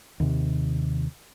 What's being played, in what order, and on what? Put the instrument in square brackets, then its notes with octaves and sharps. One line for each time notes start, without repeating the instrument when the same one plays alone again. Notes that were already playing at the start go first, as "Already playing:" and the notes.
[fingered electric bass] D#2 C3